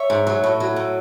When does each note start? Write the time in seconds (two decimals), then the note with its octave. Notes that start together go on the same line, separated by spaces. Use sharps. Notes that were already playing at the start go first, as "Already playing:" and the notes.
Already playing: C#5 E5
0.10 G#2
0.27 F#3
0.44 A2
0.60 F#3
0.76 A2